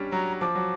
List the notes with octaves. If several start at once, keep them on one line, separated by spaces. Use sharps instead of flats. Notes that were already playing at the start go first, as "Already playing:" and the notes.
Already playing: G3 C#4 D4
F#3 A#5
F3 D6
F#3